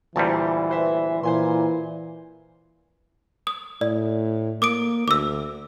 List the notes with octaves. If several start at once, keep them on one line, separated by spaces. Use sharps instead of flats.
D2 A#2 E3 G3 C5 A5
B4 C5 E5
A#2 E3 C5 G#5 C6
D#6
A2 D5
A#3 D6 D#6 D7
D2 D6 E6